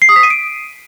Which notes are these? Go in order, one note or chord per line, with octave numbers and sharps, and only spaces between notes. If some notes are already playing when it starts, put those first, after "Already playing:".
C7
D#6
B6
D#7
D7